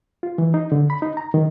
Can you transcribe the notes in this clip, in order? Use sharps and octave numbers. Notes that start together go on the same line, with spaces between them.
F4
E3
D#4
D3
B5
D#4
A#5
D#3